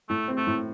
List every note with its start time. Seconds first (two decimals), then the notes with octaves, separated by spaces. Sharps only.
0.09 A2 A3
0.28 C4
0.37 A3
0.47 A2